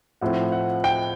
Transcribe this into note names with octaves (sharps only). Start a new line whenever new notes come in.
A2 F3 A3 C4 F#5
F#5
G5